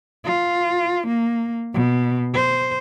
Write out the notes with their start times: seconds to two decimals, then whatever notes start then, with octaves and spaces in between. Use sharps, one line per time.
0.25 F4
1.08 A#3
1.74 B2
2.34 C5